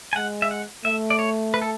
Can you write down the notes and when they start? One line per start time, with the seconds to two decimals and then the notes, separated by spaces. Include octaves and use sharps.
0.13 G#5
0.16 G#3 F#5
0.42 E5
0.51 F#5
0.85 A3 E5
1.10 D5
1.19 C#5
1.54 B4
1.62 A4